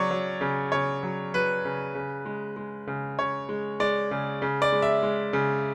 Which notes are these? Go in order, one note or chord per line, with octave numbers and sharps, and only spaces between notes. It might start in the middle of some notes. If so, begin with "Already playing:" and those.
Already playing: C#3 F#3 C#5 D5
F#3
C#3
C#3 C#5
F#3
F#3 B4
C#3
C#3
G#3
G#3
C#3
C#3 C#5
G#3
G#3 D5
C#3
C#3
D5
G#3
E5
G#3
C#3